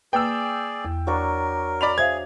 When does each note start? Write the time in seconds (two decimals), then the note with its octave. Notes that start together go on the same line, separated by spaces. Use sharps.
0.13 A#3 G#4 B4 D5 G5 E6
0.85 E2
1.07 F#3 D4 A#4 C#6
1.81 D5 B5 F7
1.98 G#4 C5 E5 F5 G#6